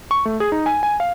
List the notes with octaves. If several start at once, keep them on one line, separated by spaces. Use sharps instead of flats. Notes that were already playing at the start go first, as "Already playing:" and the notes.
C#6
A3
G#4
D#4
G#5
G#5
F5